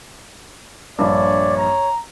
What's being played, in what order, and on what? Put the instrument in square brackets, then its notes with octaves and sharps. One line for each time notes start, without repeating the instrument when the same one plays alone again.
[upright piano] A#1 G2 [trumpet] C#5 [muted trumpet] D5
[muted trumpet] A#5